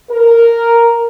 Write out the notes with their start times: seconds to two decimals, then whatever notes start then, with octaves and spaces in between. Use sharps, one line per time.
0.11 A#4